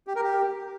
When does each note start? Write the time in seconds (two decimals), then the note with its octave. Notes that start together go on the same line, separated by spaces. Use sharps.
0.07 G4
0.15 A#4
0.24 G4